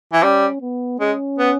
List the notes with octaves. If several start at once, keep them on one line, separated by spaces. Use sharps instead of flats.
E3
G3 C#4
B3
G#3 C#4
B3